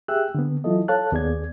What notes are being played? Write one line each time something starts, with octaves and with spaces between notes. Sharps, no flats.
G4 G#4 E5 G5 E6 F#6
D3 B3
E3 F#3 E4 F4 A4 D#5
A4 C#5 F5 A5 F#6
D#2 B3 G#4 D5 G#6